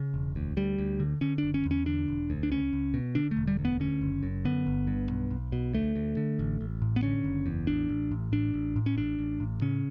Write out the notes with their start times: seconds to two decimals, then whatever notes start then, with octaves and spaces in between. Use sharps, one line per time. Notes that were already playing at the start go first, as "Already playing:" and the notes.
Already playing: C#3
0.14 E1
0.36 D2
0.57 D2 G3
0.78 D2
1.00 D3
1.21 D3 C#4
1.38 F#1 D4
1.54 C#4
1.65 E2
1.71 C#4
1.86 D3 D4
2.08 E1
2.30 D2
2.43 D4
2.51 C#2 C#4
2.73 C#2
2.94 B2
3.15 D3 D4
3.31 A3
3.37 E1
3.47 G3
3.59 D2
3.65 B3
3.80 D3 C#4
4.01 F#1
4.23 F#2
4.45 D3 B3
4.67 G1
4.87 G2
5.10 B1
5.30 B1
5.52 B2
5.73 D2 A3
5.96 D2
6.17 D3
6.39 A1
6.61 A1
6.82 A2
6.96 B3
7.03 D3 C#4
7.24 F#1
7.46 E2
7.67 A1 D4
7.89 A1
8.11 A2
8.32 A1 D4
8.54 A1
8.76 A2
8.86 C#4
8.97 A1 D4
9.19 A1
9.40 A2
9.61 C#3 C#4